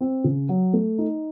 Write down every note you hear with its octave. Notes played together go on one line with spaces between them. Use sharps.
C4
C#3
F#3
A3
D#4